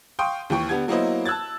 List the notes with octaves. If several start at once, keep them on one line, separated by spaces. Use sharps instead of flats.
F5 G5 C6 C#6 D#6
D#2 E3 G5 C#6
D3 B3 G4 G#6
F#3 A#3 B3 E4 C5 D#5
A5 E6 F#6 G#6 A6